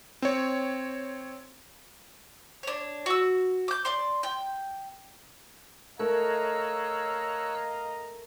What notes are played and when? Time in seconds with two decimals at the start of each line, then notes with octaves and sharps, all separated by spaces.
0.22 C4 C#5
2.63 D4 C#5
3.06 F#4 E6
3.68 D6 G6
3.85 D5 C6
4.23 G5
5.99 A3 A#4 C#5 D#5 F5 A#5 E6 F#6